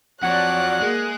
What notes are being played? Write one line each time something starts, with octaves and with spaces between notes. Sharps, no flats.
F2 F3 F#3 F#4 C#5 D5 F#5 F#6
G#3 A#3 G#4